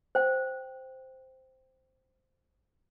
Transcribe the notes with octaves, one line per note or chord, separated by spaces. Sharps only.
C5 G5